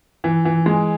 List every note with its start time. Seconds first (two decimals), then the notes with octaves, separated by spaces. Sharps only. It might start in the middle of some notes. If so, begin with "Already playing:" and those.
0.24 E3
0.45 E3
0.66 G#3